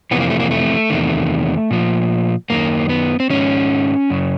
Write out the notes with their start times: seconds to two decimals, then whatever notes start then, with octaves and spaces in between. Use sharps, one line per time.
0.11 F2 C3 E3 B3
0.21 A#3
0.30 A3
0.40 A#3
0.51 A3
0.90 E2 C3 D#3
1.71 A#2 F3
2.50 F#2 D#3 A#3
2.89 B3
3.20 C4
3.30 G#2 D#3 C#4
4.10 F#2 C#3